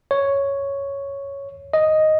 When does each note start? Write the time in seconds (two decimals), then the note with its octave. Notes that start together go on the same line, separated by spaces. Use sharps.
0.11 C#5
1.73 D#5